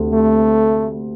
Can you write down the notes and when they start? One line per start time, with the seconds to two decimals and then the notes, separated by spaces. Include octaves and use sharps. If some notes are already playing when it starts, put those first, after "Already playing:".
Already playing: D2 C3
0.13 A3